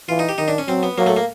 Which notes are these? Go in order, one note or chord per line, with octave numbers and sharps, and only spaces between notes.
E3 F4
D#4
G4
D#3 D#4
D4
C#4
F#3 C4
B3
F#3 A#3
A3
A#3